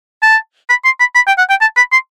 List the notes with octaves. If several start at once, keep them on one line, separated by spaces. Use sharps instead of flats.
A5
B5
C6
B5
B5
G5
F#5
G5
A5
B5
C6